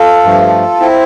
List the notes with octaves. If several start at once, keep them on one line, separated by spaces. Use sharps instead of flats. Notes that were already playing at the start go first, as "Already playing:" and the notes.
Already playing: F4 A4
G2 F3 A3
C4 E4